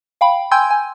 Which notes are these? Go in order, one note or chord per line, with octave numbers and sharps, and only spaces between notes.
F5 G5 B5
G5 G#5 C6 E6 G6 G#6
G#5